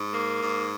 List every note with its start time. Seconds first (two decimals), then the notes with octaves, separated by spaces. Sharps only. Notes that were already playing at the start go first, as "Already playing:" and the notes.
Already playing: G#2
0.12 A#3
0.42 G#2